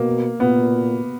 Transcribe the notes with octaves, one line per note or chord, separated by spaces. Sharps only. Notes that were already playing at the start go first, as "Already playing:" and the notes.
Already playing: B2 A#3
A#2 B3